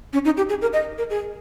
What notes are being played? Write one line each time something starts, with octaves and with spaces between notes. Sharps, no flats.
C#4
D#4
G4
G#4
A#4
D#5
A#4
G#4